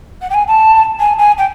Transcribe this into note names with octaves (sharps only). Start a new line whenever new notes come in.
F#5
G5
G#5
A5
G#5
G#5
G5